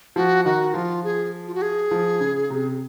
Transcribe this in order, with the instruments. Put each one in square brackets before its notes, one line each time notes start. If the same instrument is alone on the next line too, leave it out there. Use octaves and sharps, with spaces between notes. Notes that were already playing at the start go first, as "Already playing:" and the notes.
[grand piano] F3 [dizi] F#4
[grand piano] D#3 [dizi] F#4
[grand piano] F3 [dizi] F4
[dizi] G#4
F4
F#4
G#4
[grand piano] F3
C#3
C3